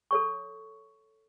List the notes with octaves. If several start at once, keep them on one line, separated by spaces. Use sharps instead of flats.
A4 C#5 C#6